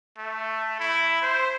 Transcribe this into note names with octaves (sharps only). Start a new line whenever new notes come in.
A3
E4
C5